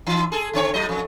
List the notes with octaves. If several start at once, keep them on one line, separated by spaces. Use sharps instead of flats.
E3 D#4
G#4 A4
D3 C4 C#5
A2 F#3 D#5
F2